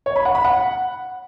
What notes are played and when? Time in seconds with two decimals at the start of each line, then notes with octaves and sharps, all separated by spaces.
0.06 C#5
0.16 B5
0.25 F#5
0.35 B5
0.44 F#5